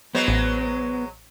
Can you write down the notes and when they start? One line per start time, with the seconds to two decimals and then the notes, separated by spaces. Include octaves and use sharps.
0.15 F#3 G#3 B3 C5
0.28 A1